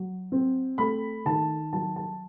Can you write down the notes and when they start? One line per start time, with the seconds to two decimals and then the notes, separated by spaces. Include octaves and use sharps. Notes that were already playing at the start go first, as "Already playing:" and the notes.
Already playing: F#3
0.32 C4
0.78 A3 B5
1.25 D#3 A5
1.73 F#3 A5
1.96 A5